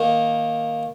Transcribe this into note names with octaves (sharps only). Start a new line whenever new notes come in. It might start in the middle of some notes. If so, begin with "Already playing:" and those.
Already playing: D#3 A#3